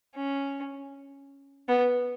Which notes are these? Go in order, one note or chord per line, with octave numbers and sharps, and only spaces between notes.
C#4
B3